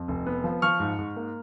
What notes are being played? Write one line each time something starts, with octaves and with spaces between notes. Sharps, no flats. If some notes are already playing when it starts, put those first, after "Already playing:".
Already playing: F2
F1
B3
F3
F3 C#6 F6
G#2
G#2
A#3